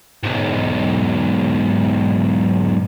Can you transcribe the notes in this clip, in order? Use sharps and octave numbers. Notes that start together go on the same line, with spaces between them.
B1 G#2